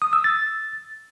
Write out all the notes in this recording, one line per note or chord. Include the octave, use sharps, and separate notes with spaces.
D#6
E6
A6